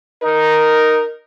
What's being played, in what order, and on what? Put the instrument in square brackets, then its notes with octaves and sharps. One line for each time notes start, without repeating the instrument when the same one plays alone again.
[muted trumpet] D#4 [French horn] A#4